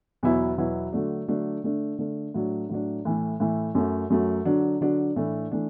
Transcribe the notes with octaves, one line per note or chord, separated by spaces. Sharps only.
E2 B2 F#3 B3 E4
E2 B2 F#3 B3 E4
D3 F#3 A3 D4
D3 F#3 A3 D4
D3 A3 D4
D3 A3 D4
A2 F#3 D4
A2 F#3 D4
A2 E3 A3
A2 E3 A3
F#2 F#3 A3
F#2 F#3 A3
D3 F#3 D4
D3 F#3 D4
A2 E3 A3 D4
E3 A3 D4